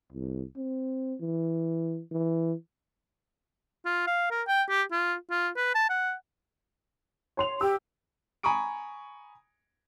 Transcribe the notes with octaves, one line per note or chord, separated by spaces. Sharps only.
C2
C4
E3
E3
F4
F5
A#4
G5
G4
F4
F4
B4
A5
F#5
C#5 C6 F7
G4 E6
G#5 A#5 B5 C#6 D#6 D7